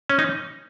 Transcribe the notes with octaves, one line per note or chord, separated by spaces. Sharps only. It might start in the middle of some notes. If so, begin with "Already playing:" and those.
C#4
E3 D#4